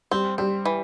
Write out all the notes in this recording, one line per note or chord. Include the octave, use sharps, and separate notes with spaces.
G3 C4
G3 C4
E3